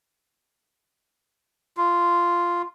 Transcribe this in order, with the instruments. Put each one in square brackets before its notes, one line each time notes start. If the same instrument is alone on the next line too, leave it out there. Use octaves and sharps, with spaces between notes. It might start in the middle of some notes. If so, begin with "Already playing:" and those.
[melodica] F4